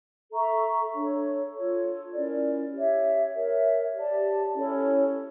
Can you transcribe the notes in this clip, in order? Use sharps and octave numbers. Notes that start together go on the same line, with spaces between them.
A4 E5 A#5 C#6
D4 A4 C#5
F4 A4 C#5
C#4 E4 A#4 D5
G4 C#5 E5
A#4 C#5 E5
G4 D5 A5
C#4 E4 A4 C#5